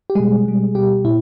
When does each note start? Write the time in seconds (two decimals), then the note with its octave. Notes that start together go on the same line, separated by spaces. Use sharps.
0.10 G4
0.15 B2 G3 G#3 G#4
0.45 B2 G3
0.75 B2 G3 G4
1.04 A#2 E4